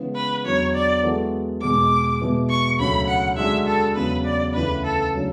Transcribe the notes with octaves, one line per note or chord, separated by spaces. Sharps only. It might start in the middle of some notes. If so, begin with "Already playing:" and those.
Already playing: C#3 E3 G#3 B3
B4
E2 D3 F#3 C#5
D5
E3 G#3 B3 F#4 A4
E2 B2 G#3 D6
B2 G#3 B3 E4
C#6
D2 C#3 F#3 B5
F#5
D3 G#3 D4 F#4 E5
A4
E2 C#3 F#3 B4
D5
D2 C#3 E3 B3 B4
A4
C#3 F#3 A3 D4